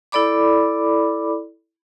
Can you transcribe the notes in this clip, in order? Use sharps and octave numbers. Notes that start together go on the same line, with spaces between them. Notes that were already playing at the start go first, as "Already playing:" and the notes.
E4 A4 D5 B5 D6